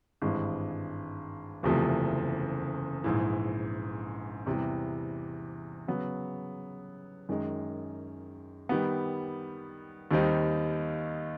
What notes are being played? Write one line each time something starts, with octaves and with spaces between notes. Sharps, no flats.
G#1 G2 E3 G#3
F#1 E2 C3 F3 A3
A#1 G#2 E3
E2 C3 E3 G3
C#3 F#3 B3
F#2 D#3 G#3
D#3 G3 B3
D#2 D#3 G3 C4 D#4